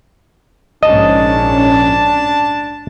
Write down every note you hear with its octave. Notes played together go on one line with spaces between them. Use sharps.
A#1 G#2 C#4 D4 D#5 A5